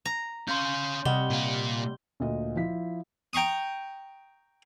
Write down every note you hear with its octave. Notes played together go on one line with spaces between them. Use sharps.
A#5
C#4 F5 C6 G6
C3 G3 D#5 F#5 G7
A#2 F5
D2 A#2 D#5
F3 E4 B6
G5 A#5 C#6 D#6